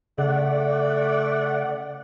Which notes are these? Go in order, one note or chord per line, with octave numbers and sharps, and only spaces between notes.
C#3 A3 D5 F#5